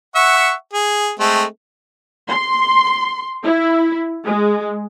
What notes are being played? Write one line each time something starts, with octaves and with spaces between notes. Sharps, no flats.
E5 F#5 C#6
G#4
G#3 A3 C4
C6
E4
G#3